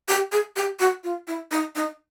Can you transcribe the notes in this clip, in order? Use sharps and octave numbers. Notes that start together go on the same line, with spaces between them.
G4
G#4
G4
F#4
F4
E4
D#4
D#4